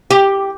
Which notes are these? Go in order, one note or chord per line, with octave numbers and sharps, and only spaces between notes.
G4